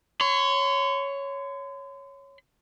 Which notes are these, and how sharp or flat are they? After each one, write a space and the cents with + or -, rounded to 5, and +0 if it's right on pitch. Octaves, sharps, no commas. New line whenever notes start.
C#5 +0 C6 -40